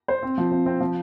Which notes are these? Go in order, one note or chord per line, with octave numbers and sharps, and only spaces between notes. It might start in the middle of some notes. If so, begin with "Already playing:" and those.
C5
C4
F3
C4
C4
F3